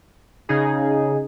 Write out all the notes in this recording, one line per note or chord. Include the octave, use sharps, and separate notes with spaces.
C#3 D#4 G#4